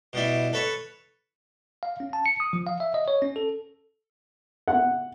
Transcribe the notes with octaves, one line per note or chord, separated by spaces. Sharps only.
B2 G3 E4
A4 B4 C#5
F5
C#4
A5
C#7
D#6
F3
F5
E5
D#5
C#5
C#4
A4
F#5